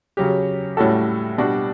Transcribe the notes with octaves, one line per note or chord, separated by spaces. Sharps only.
C#3 F#3 C#4 G4
A2 G3 C#4 F#4 A4
B2 G3 D4 F#4